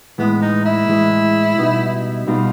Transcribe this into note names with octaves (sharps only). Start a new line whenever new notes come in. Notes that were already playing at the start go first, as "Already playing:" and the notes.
A2 E3 G#3 B3
D#4
E4
A2 E3 G#3
B2 G3 B3 D#4 F#4
B2 G3 B3 D#4 F4 F#4